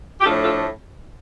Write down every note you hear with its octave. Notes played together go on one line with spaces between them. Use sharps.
G4
A2 F3 A3 D4 F4 A4
F4 A4